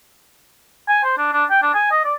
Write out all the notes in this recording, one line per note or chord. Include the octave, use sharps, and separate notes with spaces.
G#5
C5
D4
D4
G5
D4
G#5
D#5
D5